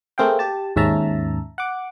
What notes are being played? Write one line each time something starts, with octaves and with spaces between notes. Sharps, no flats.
A3 A#3 C4 G#4 F5 G5
G4 A5
D#2 G#2 C#4 E5 A5 A#5
F#5 D6